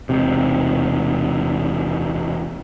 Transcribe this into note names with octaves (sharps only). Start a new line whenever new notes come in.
E1 C3